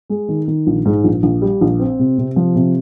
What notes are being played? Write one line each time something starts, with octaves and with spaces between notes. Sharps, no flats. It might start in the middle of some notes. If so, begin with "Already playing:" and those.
G#3
D#3
D#3
A#1
G#2
A#1
A#1
G3
A#1
C4
C3
C3
F3
C3